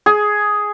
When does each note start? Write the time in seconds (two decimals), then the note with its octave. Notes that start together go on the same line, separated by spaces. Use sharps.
0.06 G#4